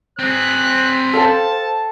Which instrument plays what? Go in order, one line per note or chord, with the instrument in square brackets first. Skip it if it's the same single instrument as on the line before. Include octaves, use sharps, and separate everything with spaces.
[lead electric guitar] C4 G#4 [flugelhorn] C5 [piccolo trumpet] F#6
[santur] A4 F5 G5 [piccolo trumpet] A5